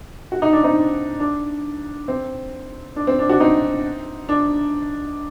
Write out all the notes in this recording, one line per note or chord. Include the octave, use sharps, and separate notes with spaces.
F#4
D#4
D4
C4 D#4
D4
C4
D4
C4
D4
D4 F#4
C4 D#4
D4